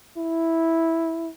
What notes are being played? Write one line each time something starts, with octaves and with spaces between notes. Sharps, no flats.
E4